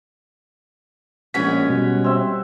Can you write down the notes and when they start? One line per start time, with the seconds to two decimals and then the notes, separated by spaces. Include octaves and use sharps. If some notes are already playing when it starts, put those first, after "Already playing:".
1.34 A#1 G#3 C#4 F#4 C#5 B6
1.69 B2 G3
2.04 C4 E5